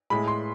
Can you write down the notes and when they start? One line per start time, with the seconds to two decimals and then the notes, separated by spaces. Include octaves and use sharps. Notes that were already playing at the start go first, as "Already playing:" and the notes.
0.10 A2 G#3 B5
0.28 C6